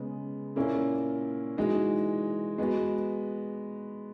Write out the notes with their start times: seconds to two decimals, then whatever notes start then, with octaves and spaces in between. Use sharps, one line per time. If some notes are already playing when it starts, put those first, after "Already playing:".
Already playing: C#3 G#3 B3
0.56 A#2 A#3 C#4 E4
1.57 E3 G#3 D#4 F#4
2.58 G#3 B3 F#4